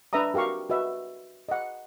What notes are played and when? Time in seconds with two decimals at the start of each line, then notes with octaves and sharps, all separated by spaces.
0.13 D4 B4 E5 A#5 D#6
0.34 F#4 G4 A#4 F5 C#6
0.70 F#4 B4 D#5 E5
1.49 D#5 F#5